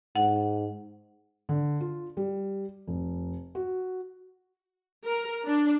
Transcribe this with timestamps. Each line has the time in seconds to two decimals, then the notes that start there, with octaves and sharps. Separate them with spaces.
0.15 G#2 F#5
1.49 D3
1.81 F4
2.17 G3
2.87 F1
3.55 F#4
5.05 A#4
5.45 D4